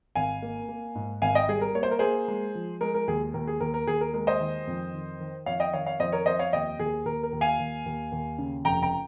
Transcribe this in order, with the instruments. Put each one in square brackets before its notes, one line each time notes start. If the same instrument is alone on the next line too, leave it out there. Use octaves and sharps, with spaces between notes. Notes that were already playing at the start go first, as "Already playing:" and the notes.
[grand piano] G#1 F5 G#5
A#3
A#3
G#2
G#1 F5 G#5
D#5 G5
G3 G#4
A#4
A#3 C#5
C5
A#4
A#3 G#4 C5
G#3
F3
G#3 A#4
A#4
D#2 G#4
D#2 A#4
G#4
D#2 A#4
A#4
D#2 G#4
A#4
G#3 A#4
C5 D#5
D#3
F2
D#3
D#3
F2 C#5 F5
D#5 G5
D#3 C#5 F5
C#5 F5
F2 C5 D#5
A#4 C#5
F2 C5 D#5
C#5 F5
D#2 D#5 G5
D#2 G#4
D#2 A#4
A#4
D#2
F5 G#5
D#2
D#2
D#2
C#3
F1 G5 A#5
G5 A#5